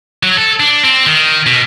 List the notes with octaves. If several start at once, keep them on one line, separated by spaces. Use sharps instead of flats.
F#3
A4
D4
C4
D#3
B2